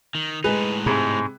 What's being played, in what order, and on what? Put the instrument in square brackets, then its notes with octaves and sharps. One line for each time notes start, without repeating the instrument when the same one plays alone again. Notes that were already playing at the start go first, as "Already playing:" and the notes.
[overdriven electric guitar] D#3
[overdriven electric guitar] A2 D#4 [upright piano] G#3 [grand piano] B4 G#5 F#6
[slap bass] G#2 [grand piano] C3 G#4 B5